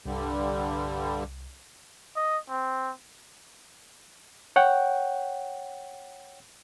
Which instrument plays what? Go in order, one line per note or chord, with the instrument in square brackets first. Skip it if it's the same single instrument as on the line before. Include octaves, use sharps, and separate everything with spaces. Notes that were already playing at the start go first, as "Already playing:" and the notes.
[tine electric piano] C2 [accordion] G2 D3 G3
[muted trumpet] D#5
C4
[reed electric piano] C#5 F#5 G5